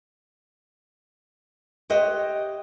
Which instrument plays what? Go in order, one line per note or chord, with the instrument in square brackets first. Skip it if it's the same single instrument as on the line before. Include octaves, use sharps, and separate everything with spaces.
[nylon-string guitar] G4 C5 C#5 D#5 E5 F#5